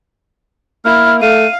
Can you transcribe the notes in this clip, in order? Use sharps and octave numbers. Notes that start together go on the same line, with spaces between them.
A#3 E4 F6
A3 F5 D#7